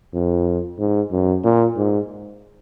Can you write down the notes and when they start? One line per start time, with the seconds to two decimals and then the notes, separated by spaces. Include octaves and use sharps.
0.13 F2
0.79 G#2
1.11 F#2
1.44 A#2
1.77 G#2